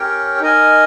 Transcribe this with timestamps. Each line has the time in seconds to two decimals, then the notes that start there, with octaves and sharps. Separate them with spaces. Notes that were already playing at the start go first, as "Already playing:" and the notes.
Already playing: C#4 G4 A#4 C#5 G5
0.41 D#4 A#4 D#5 G#5